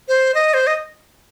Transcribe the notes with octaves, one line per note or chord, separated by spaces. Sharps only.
C5
D#5
C5
D#5